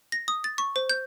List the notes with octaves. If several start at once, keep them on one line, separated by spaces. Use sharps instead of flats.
A#6
D#6
A6
C#6
C5
G6